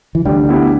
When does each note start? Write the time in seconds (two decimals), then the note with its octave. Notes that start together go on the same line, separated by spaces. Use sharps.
0.15 E3
0.25 D2 D3 G3
0.49 B3 E4 G4